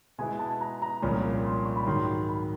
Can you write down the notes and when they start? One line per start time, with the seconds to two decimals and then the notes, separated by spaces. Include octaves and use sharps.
0.19 B2 G#3 B3 E4 G#5
0.39 A5
0.61 A#5
0.82 A#5
1.02 C2 A#2 F3 G#3 C#4 B5
1.45 C6
1.65 C#6
1.76 B5
1.86 G#2 D#3 F#3 C6
2.29 B5